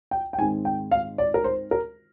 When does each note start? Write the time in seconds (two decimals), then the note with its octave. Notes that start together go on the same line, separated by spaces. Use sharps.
0.11 G5
0.33 G5
0.38 G#2 D#3 G#3 C4 G#5
0.65 G5
0.91 F5
1.18 D5
1.34 A#4
1.44 C5
1.71 A#4